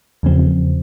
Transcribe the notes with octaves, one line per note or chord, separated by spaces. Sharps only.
E2 C#3 F3 C4